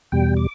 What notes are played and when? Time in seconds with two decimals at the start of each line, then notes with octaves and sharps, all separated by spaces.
0.12 E2 B2 G3 G5
0.37 D6